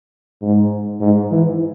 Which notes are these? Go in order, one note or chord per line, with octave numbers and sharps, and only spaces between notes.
G#2
G#2
E3